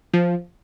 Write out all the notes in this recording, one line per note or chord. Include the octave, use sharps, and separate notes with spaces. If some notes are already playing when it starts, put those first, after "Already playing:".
F3